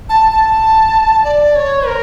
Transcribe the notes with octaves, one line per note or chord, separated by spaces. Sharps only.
A5
A5
D5
C#5
A#4